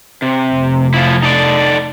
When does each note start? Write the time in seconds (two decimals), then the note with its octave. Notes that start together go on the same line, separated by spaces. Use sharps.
0.22 C3
0.52 F1
0.94 F3 E4
1.23 D#4 A4 D5